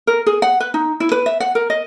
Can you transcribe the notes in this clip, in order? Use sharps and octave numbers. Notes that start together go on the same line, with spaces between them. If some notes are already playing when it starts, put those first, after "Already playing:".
A#4
G#4
F#5
B4
D#4
E4
B4
E5
F#5
A#4
D#5